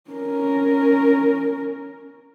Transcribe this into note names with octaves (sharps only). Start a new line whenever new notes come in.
C#4 A#4